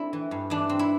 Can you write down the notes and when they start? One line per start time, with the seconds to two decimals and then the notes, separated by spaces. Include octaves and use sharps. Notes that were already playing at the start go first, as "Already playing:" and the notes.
Already playing: A3 C4 D4 E4
0.13 E3
0.31 G2
0.50 E3 D4
0.69 C4
0.79 E4